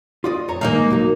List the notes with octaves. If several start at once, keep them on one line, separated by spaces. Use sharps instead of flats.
F4 D5 D#5
F2 C#5 A#5
D#3 G#3 A#3 D#4 F5
B1 F#3 F#4